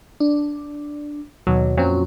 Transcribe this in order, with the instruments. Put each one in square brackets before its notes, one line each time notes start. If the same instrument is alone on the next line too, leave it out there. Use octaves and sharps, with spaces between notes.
[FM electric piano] D4
[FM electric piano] D#2 [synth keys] B2 F#3
[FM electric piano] F2 C#4 [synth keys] A#2 F#3 C4